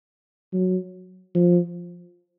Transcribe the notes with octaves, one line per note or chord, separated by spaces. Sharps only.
F#3
F3